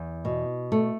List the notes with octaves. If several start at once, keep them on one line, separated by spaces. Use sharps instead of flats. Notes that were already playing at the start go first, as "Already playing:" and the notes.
Already playing: E2
B2
A3